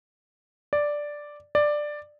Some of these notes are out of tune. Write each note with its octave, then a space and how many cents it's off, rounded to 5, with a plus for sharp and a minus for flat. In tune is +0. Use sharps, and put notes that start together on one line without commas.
D5 +0
D5 +10